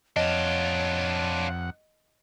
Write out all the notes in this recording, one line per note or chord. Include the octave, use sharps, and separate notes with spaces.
F2 D4 F4 C#5 D#5 F#5